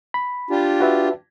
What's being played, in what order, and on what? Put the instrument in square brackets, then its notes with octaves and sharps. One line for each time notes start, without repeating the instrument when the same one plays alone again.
[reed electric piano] B5
[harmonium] D4 F4 G4
[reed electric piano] F#4 B4 E5